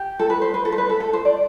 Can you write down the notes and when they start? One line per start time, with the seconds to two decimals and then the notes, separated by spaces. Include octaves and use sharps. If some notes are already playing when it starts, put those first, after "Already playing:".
Already playing: G4
0.19 A4
0.30 B4
0.41 C5
0.54 B4
0.65 A4
0.72 C5
0.78 B4
0.89 A4
1.00 A4
1.13 C5
1.25 D5